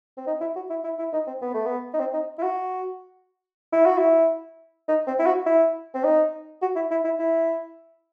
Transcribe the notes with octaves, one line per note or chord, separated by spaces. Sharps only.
C4
D#4
E4
F#4
E4
E4
E4
D#4
C4
B3
A3
B3
D#4
C4
D#4
E4
F#4
E4
F#4
E4
D#4
C4
E4
F#4
E4
C4
D#4
F#4
E4
E4
E4
E4